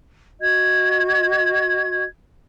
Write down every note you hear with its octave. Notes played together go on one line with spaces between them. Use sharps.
F#4 D#5 G#6